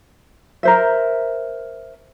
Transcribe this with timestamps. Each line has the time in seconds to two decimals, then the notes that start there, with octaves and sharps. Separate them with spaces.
0.63 A#4 C5 E5